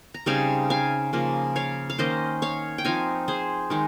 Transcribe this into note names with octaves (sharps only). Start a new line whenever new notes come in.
A#5
C#3 G3 C4 D#4 F5 G#5
F5 G#5
C#3 F3 A#3
C#5 F5
F5
D#3 A#3 C#4 C5 D#5
C#5 F5
G5
F3 C4 D#4 F5 G#5
G#4 C5
D#3 G#3 D#4